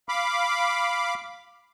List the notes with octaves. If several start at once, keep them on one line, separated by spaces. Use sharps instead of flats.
F5 B5 D6